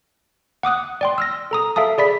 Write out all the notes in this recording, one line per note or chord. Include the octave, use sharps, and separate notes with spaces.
F#5 D6 D#6 F#6
D5 G5 C6
E6 F6 A#6
A4 A#5 D#6
A4 E5 F5 A5 D#6
G#4 D5 B5 B6